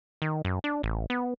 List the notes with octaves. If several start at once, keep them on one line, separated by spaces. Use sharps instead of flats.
D#3
F#2
D4
A1
B3